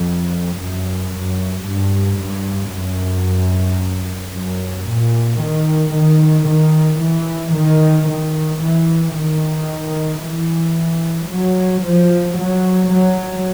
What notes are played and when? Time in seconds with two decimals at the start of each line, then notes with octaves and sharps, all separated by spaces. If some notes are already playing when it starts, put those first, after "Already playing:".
Already playing: F2
0.59 F#2
1.13 F#2
1.67 G2
2.20 G2
2.73 F#2
4.34 F#2
4.88 A#2
5.42 D#3
5.95 D#3
6.48 D#3
7.02 E3
7.56 D#3
8.09 D#3
8.63 E3
9.16 D#3
10.24 E3
11.30 F#3
11.85 F3
12.38 F#3
12.91 F#3